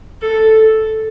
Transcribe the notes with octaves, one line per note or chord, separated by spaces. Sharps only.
A4